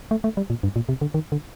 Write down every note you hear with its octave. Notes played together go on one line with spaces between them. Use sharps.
A3
A3
G3
A#2
G2
A#2
C3
D3
D#3
D3